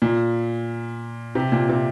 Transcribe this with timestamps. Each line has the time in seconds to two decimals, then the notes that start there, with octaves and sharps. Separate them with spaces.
0.02 A#2
1.35 C3
1.52 A#2
1.69 C3